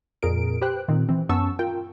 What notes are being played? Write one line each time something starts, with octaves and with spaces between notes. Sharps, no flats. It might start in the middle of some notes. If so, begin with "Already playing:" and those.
F2 A#2 G#4 A#4 D7
G4 B4 C5 G5 F#6
A#2 D#3 C4
E3 C4
F#2 B3 C#4 A5 C#6 E6
F4 A#4 G5